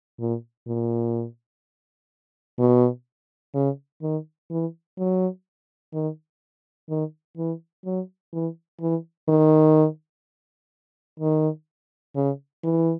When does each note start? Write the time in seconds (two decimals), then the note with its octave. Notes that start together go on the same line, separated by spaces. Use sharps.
0.20 A#2
0.67 A#2
2.59 B2
3.54 C#3
4.02 D#3
4.50 E3
4.98 F#3
5.94 D#3
6.89 D#3
7.37 E3
7.85 F#3
8.33 E3
8.81 E3
9.28 D#3
11.20 D#3
12.16 C#3
12.64 E3